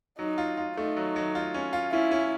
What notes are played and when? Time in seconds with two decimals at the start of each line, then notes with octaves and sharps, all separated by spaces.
0.19 F#3 D#4
0.38 F4
0.57 F4
0.77 A3 D#4
0.97 F#3
1.16 F#3
1.35 F4
1.54 C#4
1.73 F4
1.92 C#4 E4
2.11 C#4